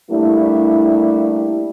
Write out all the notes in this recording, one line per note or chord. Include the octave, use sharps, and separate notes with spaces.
G3 A3 A#3 D4 E4